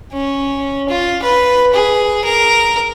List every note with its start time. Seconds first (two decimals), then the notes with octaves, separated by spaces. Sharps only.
0.13 C#4
0.89 F4
1.23 B4
1.73 G#4
2.25 A#4